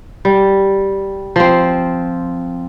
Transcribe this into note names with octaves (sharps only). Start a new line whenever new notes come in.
G3
F3 C4